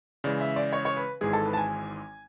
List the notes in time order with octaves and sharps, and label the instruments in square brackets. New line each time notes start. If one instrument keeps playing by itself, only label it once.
[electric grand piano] C#3 E3 G#3 [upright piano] D5
[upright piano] E5
D5
C#5
C#5
B4
[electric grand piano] G#1 G#2 E3 G#3 [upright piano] G#4
[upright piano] A4
B4
A5
G#5